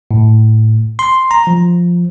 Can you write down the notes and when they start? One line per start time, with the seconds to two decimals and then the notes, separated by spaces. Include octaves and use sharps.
0.11 A2
0.99 C6
1.31 A#5
1.47 F3